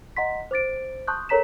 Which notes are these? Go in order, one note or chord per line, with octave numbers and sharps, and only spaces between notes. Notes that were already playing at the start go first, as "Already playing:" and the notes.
D#5 F#5 A#5 C6 B6
C5 D6 A6 D7
A5 C6 C#6 D#6 F#6 G6
A4 A#4 C#5 A#5 B6 E7